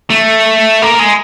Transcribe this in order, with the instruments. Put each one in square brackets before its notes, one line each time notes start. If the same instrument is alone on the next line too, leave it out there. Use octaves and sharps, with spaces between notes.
[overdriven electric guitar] A3
A#3
G#3